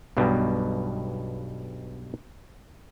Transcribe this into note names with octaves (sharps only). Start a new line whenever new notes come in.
B1 G2 B2 G3